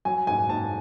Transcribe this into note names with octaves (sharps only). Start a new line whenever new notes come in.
F#3 G#5
G#2 G#5
G#2 A5